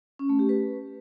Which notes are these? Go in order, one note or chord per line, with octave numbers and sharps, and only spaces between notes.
C#4
A3
G4
B4